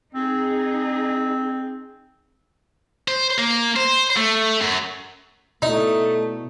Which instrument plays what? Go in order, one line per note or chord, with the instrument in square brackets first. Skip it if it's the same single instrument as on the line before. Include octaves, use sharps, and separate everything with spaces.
[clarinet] C4 [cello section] D#4 G#4
[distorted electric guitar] C5
A#3
C5
A3
F#2
[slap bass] B2 [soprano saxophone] A3 [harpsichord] D#4 [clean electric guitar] E4 D5